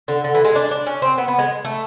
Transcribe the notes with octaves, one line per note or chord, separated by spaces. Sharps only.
D3
D3
E3
G#3
D4
D4
C#4
C4
B3
B3
G#3
A3